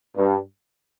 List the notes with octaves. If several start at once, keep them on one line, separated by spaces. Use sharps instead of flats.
G2